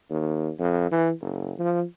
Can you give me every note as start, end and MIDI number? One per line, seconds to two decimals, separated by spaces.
0.10 0.50 39
0.59 0.89 41
0.91 1.12 52
1.21 1.52 30
1.59 1.83 53